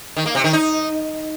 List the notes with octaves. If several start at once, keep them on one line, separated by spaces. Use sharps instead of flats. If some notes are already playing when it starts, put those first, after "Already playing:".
D#3
A#3
C3
D#3
D#4